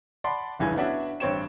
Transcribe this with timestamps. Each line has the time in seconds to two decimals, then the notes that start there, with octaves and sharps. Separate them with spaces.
0.24 D5 F#5 A5 B5 C6
0.59 F1 C#2 G2 E3 E4 G#5
0.76 B3 C#4 D4 F#4 E5
1.20 A1 G2 C4 C#5 G5 E7